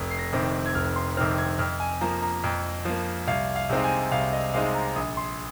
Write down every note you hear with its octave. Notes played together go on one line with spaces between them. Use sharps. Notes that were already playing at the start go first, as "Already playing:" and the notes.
Already playing: F1 D#6
C7
A#6
F2 C3 D#3 C4
G#6
F1 F6
C6
F2 C3 D#3 C4 F6
G#6
F2 F6
G#5
F3 A#3 A#5
A#5
F2
F3 A#3
C2 F5
F5
C3 G#3 C4 D#4
G#5
C2 F5
D#5
C3 G#3 C4 D#4 F5
A#5
A#1 D#6
C6